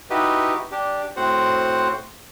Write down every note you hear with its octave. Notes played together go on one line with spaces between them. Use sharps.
D#4 E4 F#4 G4 B4
D4 G4
A2 C4 F#4 C5 F#5